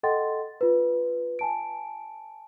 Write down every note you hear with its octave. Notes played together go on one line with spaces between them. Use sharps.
A4 D#5 F#5 G5 C6 A6
F4 B4
G#5 A5 D7